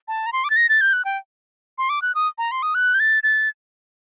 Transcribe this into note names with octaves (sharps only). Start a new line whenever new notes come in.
A5
A#5
C6
D6
A6
A#6
A6
G6
F#6
G5
C6
D6
F#6
D#6
A#5
C6
D#6
F#6
G6
A6
A6